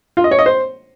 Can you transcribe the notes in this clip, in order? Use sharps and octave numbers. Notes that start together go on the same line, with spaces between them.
F4
D#5
C#5
D#5
C5